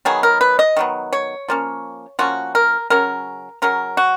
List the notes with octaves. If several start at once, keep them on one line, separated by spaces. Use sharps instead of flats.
D#3 F#3 B3 G#4
A#4
B4
D#5
D#3 F#3 B3
C#5
F3 A#3 C#4
F3 A#3 C#4 F#4
A#4
C#3 F#3 C#4 A#4
C#3 F#3 C#4 A#4
F#4